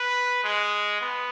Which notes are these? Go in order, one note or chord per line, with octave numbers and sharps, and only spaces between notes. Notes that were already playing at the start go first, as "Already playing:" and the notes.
Already playing: B4
G#3
B3